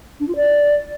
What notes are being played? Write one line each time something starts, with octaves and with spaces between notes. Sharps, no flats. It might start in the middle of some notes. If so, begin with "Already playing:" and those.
D4
F4
D5